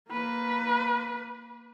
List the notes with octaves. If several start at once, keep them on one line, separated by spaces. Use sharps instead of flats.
A#3 B4